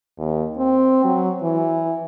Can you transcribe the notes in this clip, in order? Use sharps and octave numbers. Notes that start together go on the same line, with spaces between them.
D#2
C4
F#3
E3